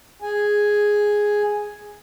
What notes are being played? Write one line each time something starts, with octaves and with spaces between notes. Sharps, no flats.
G#4 G#5